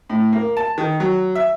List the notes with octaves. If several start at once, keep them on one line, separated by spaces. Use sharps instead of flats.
A2
A#3
A5
D#3
F#3
E5